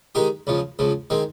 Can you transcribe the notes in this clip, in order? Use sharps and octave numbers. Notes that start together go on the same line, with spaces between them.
D#3 G#3 D#4 G4
C#2 C#3 F3
C#2 C#3 F3
D#3 G#3 C4